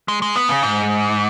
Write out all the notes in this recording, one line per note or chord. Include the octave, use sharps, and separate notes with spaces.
G#3
G#3
B3
C#3
G#2